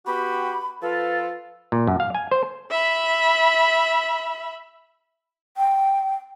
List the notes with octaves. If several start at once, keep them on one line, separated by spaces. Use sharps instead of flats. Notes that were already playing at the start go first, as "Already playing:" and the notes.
B3 F#4 G4 B5
F3 F4 A4 B4
A#2
F#2
F5
G#5
C5
E5 B5
G5